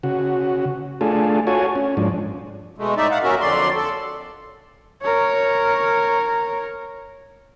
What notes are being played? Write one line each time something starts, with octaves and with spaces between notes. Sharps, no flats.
C#3 F#4
A3 D4 F4 G#4 A4
F4 F#4 A4 C#5 G#5
C#4
G#2 F3 D4
B2 G#3 A3
A2 D#4 D5 E5
F5 F#5
D#2 C#4 F#4 A#4 E5
F2 D3 F#3 D5 C6
A4
A#4 C#5